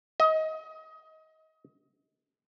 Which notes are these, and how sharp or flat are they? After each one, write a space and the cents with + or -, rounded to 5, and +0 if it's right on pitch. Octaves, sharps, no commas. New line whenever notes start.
D#5 +25